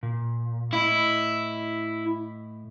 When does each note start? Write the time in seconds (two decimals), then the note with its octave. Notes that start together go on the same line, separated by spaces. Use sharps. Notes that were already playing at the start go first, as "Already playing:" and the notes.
0.03 A#2
0.73 A2 E4 D#5